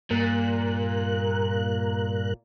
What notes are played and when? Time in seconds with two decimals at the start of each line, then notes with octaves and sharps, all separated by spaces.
0.11 G2 A#2 A#4 F#6